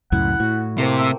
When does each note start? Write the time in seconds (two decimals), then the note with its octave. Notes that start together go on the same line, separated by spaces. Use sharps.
0.12 C#2 F#2 A2 E4 F#5
0.40 A2 F#4
0.78 C3 A3 A#3 C4
0.98 E5